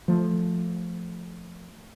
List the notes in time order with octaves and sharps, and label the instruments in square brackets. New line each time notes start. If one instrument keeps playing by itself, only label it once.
[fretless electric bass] F3 A3